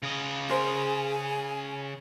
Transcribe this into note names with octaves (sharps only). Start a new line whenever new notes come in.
C#3 D#5
G#4 A#4 C5 G#5